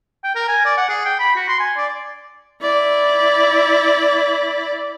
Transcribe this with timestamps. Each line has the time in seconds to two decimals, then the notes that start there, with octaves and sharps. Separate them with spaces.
0.24 G5
0.35 A#4
0.48 G#5
0.65 D5
0.77 F#5
0.89 G#4
1.05 G5
1.19 B5
1.36 F#4
1.48 C6
1.60 G#5
1.77 D5
2.61 E4 D5